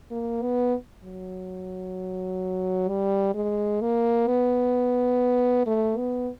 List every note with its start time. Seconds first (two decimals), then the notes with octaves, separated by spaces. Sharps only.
0.11 A#3
0.42 B3
1.04 F#3
2.88 G3
3.34 G#3
3.81 A#3
4.28 B3
5.66 A3
5.97 B3